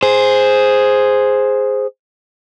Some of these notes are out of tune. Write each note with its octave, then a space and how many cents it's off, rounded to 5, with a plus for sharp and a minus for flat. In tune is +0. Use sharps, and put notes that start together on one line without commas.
G#4 +0 C5 +0